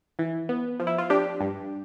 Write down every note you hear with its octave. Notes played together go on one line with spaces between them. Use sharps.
E3
B3
F3
E4
F4
D4 G4
G2